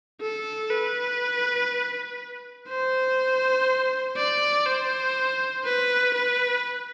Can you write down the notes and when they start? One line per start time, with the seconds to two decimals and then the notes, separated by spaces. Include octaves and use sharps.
0.21 A4
0.70 B4
2.68 C5
4.17 D5
4.66 C5
5.64 B4
6.14 B4